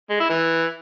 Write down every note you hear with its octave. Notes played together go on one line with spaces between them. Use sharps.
G#3
E4
E3